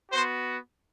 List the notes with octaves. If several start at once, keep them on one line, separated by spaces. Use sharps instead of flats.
B3 F#4 C5